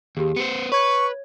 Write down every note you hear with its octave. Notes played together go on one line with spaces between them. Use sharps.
D#2 G4 G#4
B3 C5 C#7
B4 C#5 C#6 G#6